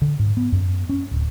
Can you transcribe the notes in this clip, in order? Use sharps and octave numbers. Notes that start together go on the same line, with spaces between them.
D3
G#2
B3
F#2
C#4
D1